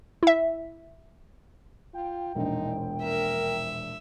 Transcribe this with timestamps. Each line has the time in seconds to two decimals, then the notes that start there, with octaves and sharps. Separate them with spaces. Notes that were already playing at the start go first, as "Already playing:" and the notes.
0.23 E4 E5
1.94 F4 G5
2.35 E1 A#1 D#4
3.03 A#4 E5